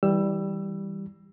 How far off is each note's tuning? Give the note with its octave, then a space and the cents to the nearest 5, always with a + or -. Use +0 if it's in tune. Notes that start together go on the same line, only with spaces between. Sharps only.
E3 -20 G3 +0 E6 +20